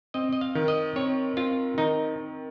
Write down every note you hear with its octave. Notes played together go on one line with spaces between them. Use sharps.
C4 D#5
D#5
F5
D#3
D#5
C4 C#5
C4 F4
D#3 D#4